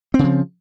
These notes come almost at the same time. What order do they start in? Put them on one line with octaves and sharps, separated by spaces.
C4 C#3 F3